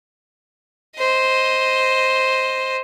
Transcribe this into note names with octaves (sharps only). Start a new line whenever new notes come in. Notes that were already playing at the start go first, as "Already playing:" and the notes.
C5 D#5